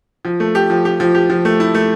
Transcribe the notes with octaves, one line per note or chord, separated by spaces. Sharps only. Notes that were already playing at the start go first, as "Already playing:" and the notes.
F3
A3
G4
F3
G4
F3
G4
F3
A3
E4
A3